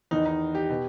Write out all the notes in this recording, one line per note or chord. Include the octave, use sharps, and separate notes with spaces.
E2 D#3 D#4
D#4
G4
B2